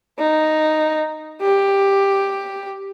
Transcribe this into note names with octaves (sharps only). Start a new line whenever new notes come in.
D#4
G4